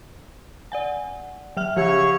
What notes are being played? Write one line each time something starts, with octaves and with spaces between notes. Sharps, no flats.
D5 F#5 G#5
F#3 E5 F6
C#3 F3 G4 C#5 E6